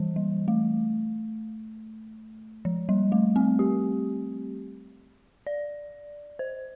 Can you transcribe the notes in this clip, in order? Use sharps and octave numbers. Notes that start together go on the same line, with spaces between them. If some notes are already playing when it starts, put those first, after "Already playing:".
Already playing: E3 G3
G3
A3
F3
G3
A3
C4
G4
D5
C5